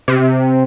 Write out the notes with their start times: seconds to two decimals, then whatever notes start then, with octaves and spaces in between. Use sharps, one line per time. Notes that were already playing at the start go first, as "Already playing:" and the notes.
0.08 C3